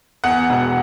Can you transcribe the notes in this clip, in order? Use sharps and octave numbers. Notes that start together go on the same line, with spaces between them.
E2 F#5
E1